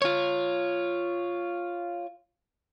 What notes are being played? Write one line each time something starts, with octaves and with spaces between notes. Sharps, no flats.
F4 C#5